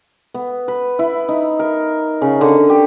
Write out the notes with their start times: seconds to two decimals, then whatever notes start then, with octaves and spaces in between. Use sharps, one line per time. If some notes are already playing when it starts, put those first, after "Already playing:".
0.34 B3
0.68 B4
0.99 E4
1.29 D#4
1.59 A#4
2.22 C#3
2.41 D3
2.70 G4